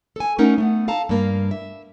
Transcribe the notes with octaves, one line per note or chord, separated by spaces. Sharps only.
A4 G#5
A3 C#4 D#4 A#4 F#5
A3 B3 F#5
A4 F5 A5 A#5
G2 A#3 F5
E5